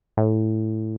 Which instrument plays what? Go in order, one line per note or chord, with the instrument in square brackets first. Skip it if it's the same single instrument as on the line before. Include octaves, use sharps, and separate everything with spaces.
[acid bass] A2